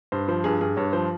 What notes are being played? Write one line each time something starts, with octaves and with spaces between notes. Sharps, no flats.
G2 C5
F3 C5
G2 G#4
G2 G#4
G2 C#5
F3 C5